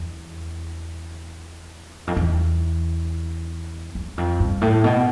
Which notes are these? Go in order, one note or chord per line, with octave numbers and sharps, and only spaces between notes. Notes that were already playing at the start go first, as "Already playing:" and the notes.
Already playing: E2
F2
E2
E2
F2
G2
A2
B2